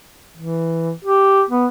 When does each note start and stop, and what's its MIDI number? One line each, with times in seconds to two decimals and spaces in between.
0.37 0.92 52
1.05 1.42 67
1.50 1.66 59